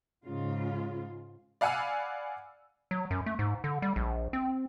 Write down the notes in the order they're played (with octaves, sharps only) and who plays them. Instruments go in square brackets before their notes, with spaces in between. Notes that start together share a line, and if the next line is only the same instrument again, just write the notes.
[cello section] G#2 C#3 F4
[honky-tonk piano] D5 F5 F#5 G#5 B5 E6
[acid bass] F#3
F#2
A3
G#2
D3
G3
A#1
C4